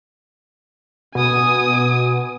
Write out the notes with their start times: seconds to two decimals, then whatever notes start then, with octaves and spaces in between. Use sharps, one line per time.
1.15 B2 G#5 D#6